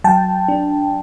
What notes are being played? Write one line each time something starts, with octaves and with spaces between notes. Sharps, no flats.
F#3 G5 A5
D4